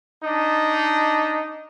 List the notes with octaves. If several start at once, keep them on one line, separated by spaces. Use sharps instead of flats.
D4 D#4